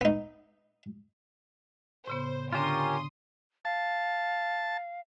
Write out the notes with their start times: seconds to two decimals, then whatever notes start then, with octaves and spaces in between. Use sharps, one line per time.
0.01 B3 D#4
2.07 A2 C#3 B3 C5
2.53 D3 C#4 D4 F4 G4 A#4 C6 D#6
3.65 F5 A5